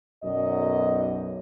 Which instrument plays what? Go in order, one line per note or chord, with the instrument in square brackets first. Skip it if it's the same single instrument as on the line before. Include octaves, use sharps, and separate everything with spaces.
[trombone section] B1 F#2 [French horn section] F#4 D5 D#5